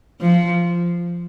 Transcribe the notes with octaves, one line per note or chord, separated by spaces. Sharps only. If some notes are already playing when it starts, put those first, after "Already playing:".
F3